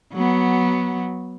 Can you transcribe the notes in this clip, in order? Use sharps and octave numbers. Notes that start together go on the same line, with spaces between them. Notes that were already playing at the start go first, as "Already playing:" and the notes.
F#3 B3